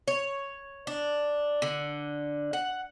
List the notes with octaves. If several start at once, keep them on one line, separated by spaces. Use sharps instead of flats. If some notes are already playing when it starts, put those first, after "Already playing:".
C#5
D4
D3
F#5